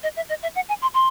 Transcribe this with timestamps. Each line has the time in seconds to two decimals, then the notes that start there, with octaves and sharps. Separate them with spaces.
0.03 D#5
0.16 E5
0.29 D#5
0.42 E5
0.55 F#5
0.69 G#5
0.82 C6
0.94 C6